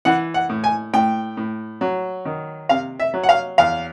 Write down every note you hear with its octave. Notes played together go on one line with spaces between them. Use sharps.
E3 F#5
F#5
A2
G#5
A2 G5
A2
F#3
D#3
C3 F5
E5
F#3
F#5
F5
E2 F5